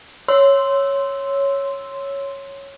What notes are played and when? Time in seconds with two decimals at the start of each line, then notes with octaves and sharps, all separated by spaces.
0.28 C#5 C6 E6